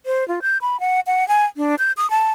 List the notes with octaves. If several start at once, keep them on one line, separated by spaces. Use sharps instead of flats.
C5
F4
G6
B5
F#5
F#5
G#5
D4
G6
D#6
A5